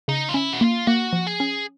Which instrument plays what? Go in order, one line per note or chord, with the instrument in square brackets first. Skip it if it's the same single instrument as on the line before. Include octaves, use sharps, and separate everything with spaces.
[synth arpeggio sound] C#3 [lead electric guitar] D#4
[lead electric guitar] F4
[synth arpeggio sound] C#4 [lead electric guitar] E4
[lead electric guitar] F#4
[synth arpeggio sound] A#3 [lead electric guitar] F4
[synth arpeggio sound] A#3 [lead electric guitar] F#4
[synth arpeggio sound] F3
[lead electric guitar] G#4
[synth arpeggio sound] C#4